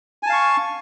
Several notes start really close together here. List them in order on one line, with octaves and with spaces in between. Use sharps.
G#5 A5 F5 C#6